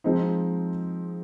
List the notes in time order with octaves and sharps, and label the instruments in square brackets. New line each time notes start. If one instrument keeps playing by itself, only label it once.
[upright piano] F3 G#3 C4 D#4